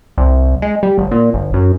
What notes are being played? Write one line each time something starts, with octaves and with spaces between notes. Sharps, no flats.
C2
G#3
G3
G1
A#2
G1
F#2